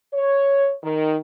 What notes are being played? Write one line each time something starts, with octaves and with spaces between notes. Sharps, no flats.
C#5
D#3